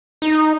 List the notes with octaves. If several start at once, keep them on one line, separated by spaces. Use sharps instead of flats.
D#4